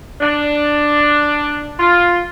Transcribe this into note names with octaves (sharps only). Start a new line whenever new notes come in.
D4
F4